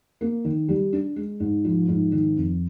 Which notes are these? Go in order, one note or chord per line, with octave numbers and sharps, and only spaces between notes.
A#3
D#3
G3
D4
G#3
G#2
F3
G#2
D#3
F2